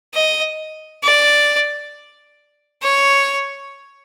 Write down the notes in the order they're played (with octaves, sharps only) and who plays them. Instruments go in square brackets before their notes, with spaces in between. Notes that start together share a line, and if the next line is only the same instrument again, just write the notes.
[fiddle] D#5
D5
C#5